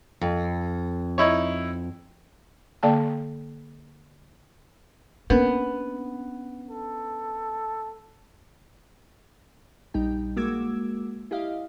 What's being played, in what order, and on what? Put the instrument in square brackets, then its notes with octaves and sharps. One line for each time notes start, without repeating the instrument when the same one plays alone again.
[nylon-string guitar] F2
[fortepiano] D#4 E4 C#5
[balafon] D3 A#3 D5 G5 A5
[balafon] A#3 A#4 B4 [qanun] B3 [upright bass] C#4 D4
[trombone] A4
[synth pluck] A#1 G3 D#4 G5
G#3 A#3 F#4 D6 E6 G#6
E4 G4 D#5 F5